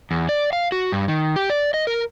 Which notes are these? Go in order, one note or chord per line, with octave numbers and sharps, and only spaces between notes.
E2
D5
F5
F#4
G2
D#3
G4
D5
D#5
A#4